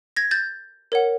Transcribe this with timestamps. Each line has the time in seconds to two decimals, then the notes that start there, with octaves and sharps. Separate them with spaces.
0.16 G#6 A#6
0.31 G6 A6
0.92 A#4 C#5 F#5